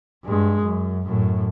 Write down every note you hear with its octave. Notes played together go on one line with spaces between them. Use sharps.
G2 G#3
F#2
F#2 A2